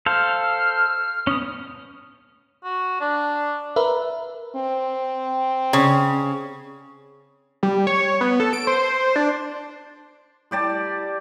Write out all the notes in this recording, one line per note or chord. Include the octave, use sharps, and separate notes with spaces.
A4 C5 F5 F6
B3 C#4 D#6
F#4
D4
A#4 B4 E5
C4
C#3
G3
C#5
B3
A4
D7
C5
D4
G3 G4 D5 A5